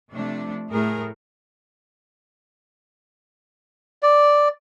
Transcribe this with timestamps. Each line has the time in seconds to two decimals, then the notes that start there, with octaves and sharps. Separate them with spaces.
0.12 C3 F3 A3 D4
0.70 A2 A3 G#4 A#4
4.03 D5